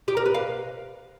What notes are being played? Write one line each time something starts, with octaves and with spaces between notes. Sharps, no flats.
G4
A#4
B4
F5